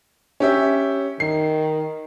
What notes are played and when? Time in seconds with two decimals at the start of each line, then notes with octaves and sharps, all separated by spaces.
0.40 C#4 G4 E5
1.20 D#3 C7